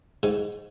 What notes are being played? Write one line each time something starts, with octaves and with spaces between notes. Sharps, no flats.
G#2